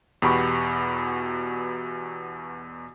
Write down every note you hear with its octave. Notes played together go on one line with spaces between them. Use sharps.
E2 B2 F#4 G4 B5 C#6